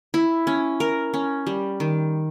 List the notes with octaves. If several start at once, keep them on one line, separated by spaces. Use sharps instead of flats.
E4
C#4
A#4
C#4
G3
D#3